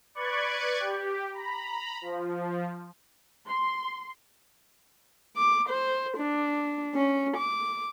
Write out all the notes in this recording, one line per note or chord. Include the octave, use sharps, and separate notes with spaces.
B4 D5 C#6 F#6 G#6
G4
A#5 B5
F3
C6
D6
C5
D4
C#4
D6